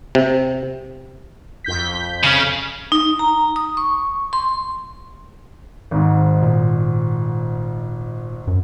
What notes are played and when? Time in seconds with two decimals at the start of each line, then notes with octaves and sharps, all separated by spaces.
0.15 C3
1.64 F2 G6 B6
2.24 C#3 C#4
2.92 D#4
3.19 A#5
3.56 D#6
3.77 C#6
4.33 C6
5.91 G#1 G#2
6.42 A#2
8.47 F#2